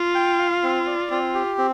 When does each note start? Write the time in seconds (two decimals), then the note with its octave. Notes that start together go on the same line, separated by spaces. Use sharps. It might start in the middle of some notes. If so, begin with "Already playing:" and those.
Already playing: F4
0.15 G5
0.39 F5
0.63 C4
0.87 D5
1.10 C4 F4
1.35 G4
1.58 C4